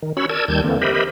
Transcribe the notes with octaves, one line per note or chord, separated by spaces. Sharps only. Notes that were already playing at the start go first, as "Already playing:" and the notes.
D#3
C#4 F#4 C#5 B5 E6
A#4 D5 A5 E6 G#6
D#2 D#3 G3 A5 G6 G#6
D3 E3 A#3 C4
G4 A#4 C5 D#5 E5 B5